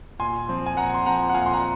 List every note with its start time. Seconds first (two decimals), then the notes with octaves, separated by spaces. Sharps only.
0.19 A#2 G#5 C6
0.48 F3 C4
0.66 G#5
0.77 A#2 F#5 A#5
0.94 C6
1.06 F3 C4 F#5 A#5
1.29 F#5
1.34 A#2 F5 G#5
1.46 C6
1.53 F#5 A#5